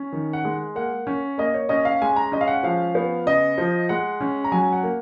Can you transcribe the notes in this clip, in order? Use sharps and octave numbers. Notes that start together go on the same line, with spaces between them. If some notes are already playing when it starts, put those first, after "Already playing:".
Already playing: C#4
D#3
F#5
G#3
A#3 F#5
C#4
A#3 D#5
C#5
C#4 D#5
F5
G#3 G#5
A#5
C#4 D#5
F5
F#5
F3 F5
B3
C#3 D#5
F3
G#3 F#5
C#4
A#5
F#3 G#5
F#5
A#3